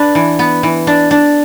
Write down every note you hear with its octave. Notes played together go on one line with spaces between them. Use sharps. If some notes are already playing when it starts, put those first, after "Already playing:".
Already playing: D4 B4
E3
B3
E3
D4
D4